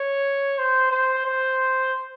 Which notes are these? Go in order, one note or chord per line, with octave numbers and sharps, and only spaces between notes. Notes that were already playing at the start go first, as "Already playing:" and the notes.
Already playing: C#5
C5
C5
C5